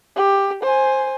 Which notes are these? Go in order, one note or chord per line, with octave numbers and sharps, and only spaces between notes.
G4
C5 G#5